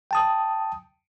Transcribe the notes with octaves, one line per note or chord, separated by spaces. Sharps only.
G5 A5 D#6